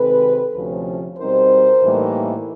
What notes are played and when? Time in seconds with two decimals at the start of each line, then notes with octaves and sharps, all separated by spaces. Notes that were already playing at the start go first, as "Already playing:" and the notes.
Already playing: C3 D#3 G#3 C4 A4 B4
0.54 D2 C3 F3 A3 C#4
1.18 B2 G3 C4 D#4 A#4 C5
1.83 A2 E3 G3 A#3 D#4